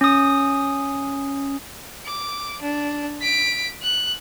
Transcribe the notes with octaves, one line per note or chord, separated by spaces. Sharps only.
C#4 D#6
D6
D4
B6 D7
F#6